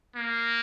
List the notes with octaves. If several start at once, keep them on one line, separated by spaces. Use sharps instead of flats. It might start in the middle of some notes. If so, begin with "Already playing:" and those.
A#3